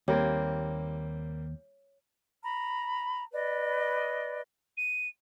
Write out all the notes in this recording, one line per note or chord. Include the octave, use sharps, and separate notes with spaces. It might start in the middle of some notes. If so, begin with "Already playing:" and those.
D#2 G3 A#3 C4 C#5
A#5 B5
B4 D5 D#5
D#7